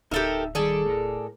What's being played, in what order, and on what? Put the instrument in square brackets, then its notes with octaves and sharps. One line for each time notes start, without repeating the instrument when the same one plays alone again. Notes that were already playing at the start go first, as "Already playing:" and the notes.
[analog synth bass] D1 [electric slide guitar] D#4 E5 [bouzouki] G4 A4 A#4
[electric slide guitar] D#3 G3 [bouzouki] G#4 A4 D5
[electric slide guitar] A2 A#4